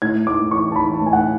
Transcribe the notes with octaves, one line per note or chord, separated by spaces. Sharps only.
A2 G#6
A2 D6
E3 C#6
A5
E3 B5
A5
A2
G#5
F#5